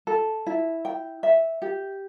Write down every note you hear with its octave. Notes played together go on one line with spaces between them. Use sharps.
A4
E4
G5
E5
G4